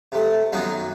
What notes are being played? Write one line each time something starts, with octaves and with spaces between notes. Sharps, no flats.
C3 A3
F#2 D#3 A#3 B3 D#4 F#4